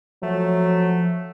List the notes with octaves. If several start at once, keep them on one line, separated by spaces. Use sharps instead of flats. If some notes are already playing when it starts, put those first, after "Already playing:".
F3 F#3 A3